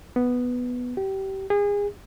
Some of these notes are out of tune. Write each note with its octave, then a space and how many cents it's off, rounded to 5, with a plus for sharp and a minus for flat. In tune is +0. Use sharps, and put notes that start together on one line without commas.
B3 +0
G4 -25
G#4 -30